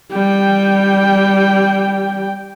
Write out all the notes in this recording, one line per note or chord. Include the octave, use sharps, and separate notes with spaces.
G3 G5